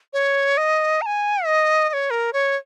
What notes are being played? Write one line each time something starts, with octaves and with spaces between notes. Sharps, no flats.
C#5
D#5
A#5
G#5
D#5
D#5
C#5
A#4
C#5